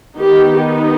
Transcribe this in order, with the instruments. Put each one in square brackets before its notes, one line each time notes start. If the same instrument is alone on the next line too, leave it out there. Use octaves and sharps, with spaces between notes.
[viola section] D#3 B3 D#4 G4